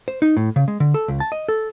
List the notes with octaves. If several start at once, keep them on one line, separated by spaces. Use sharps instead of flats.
C5
D#4
A2
C#3
G#3
D3
A4
C#2
A5
D#5
A4